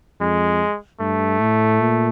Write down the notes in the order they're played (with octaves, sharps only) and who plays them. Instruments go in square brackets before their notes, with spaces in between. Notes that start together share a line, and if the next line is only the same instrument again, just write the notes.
[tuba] F2 [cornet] G#3
[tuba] G2 [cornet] A3
[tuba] A2
A#2